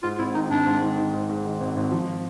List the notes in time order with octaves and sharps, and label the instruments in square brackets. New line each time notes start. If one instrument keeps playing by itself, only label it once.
[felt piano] G#2 [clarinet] F4
[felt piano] G#1 [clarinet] E4
[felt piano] D#3 [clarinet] D#4
[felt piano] G#1 [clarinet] D4
[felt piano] G#2
D#3
D#3
G#2
G#2
D#3
G#1
G#1
F3